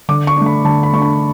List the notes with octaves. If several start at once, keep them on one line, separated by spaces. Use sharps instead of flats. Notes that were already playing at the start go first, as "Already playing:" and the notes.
D3 D6
C#6
A3 D4
B5
D3 A5
B5
A3 D4 C#6
B5